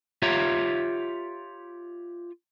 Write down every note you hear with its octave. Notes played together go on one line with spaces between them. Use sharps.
F4 G4 C#5 E5 A#5